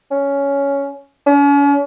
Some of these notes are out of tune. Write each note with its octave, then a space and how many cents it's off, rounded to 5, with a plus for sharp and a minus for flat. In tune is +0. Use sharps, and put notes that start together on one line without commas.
C#4 +10
C#4 +40